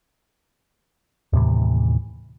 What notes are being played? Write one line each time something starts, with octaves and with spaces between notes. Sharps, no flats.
D#2 A2 C3 E3